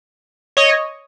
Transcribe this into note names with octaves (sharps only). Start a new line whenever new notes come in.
C#5 D#5